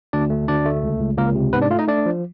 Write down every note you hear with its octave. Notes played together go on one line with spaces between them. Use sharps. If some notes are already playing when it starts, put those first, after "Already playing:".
D2 D4 D5
A3
D2 D4 D5
A3
C#2
C#2
C#2 A#3 A#4
C3
G#2 B3 B4
D4 D5
A3 F4 F5
D#4 D#5
A3 D4 D5
F3